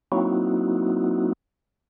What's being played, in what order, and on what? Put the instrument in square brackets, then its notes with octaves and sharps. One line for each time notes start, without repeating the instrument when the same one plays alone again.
[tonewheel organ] F#3 A#3 C4 D#4 E4 F#4